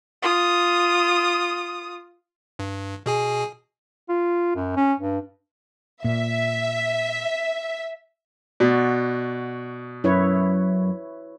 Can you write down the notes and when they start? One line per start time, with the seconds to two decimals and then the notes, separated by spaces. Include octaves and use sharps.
0.22 F4 D#6
2.59 G2
3.06 B2 G#4 G#5
4.09 F4
4.56 F#2
4.77 C#4
5.00 G2
6.04 A#2 E5
8.60 B2 F#4 D5
10.04 F#2 E4 B4 C#5